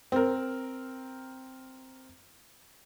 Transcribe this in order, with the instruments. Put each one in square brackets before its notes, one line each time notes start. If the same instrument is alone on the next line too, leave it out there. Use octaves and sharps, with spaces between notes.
[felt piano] C4 A#4